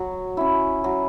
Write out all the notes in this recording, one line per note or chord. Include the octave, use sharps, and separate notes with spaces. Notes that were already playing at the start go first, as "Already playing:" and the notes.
Already playing: F#3
C#4 E4
F#3